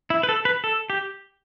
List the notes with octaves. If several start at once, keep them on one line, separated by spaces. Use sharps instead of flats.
E4
B4
A4
B4
A4
G4